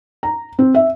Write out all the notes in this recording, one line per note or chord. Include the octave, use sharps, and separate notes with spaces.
A#5
C4
E5